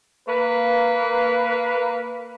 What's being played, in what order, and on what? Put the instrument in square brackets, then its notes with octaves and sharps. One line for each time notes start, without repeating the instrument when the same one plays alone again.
[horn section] A#3 B4